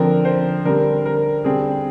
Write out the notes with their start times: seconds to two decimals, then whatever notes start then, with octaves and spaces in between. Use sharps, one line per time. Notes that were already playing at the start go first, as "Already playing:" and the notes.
Already playing: D3 F3 C4 A#4
0.25 C5
0.65 D3 G3 C4 A#4
1.06 A#4
1.44 D3 G3 C4 G#4